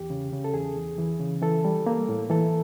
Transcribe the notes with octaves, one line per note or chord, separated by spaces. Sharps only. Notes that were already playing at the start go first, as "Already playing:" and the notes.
Already playing: E2 G4
C#3
C#3
A4
E2 G#4
E2
E3
C#3
E3 A4
G3
A#3
A2
E3 A4